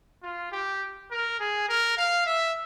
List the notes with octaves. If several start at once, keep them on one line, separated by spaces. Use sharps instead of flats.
F4
G4
A#4
G#4
A#4
F5
E5